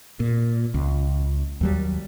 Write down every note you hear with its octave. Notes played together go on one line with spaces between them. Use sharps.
A#2
C#2
D#2 F#3 G3